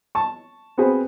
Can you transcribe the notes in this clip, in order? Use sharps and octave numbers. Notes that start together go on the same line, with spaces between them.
A5 C#6
B3 C4 F#4 G#4 B4 C5